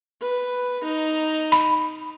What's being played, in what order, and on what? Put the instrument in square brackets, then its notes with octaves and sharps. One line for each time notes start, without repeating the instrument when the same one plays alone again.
[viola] B4
D#4 A#5
[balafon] B5